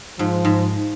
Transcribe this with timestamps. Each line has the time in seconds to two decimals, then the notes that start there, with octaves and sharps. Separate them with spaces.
0.19 G#2 F3
0.45 G#2